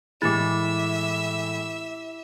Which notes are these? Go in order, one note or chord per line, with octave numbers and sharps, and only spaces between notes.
A2 E3 G#3 E4 G4 E5